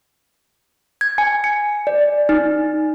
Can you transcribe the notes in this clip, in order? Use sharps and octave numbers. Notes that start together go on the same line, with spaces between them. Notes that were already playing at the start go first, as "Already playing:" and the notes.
G#6
G#5
C#7
D5
D#4